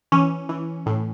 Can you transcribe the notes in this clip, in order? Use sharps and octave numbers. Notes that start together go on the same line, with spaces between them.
E3 C#4
E3
A2